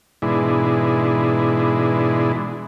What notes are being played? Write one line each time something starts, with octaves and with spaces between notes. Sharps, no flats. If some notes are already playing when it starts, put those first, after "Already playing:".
G#2 B2 E3 G#3 D4 E4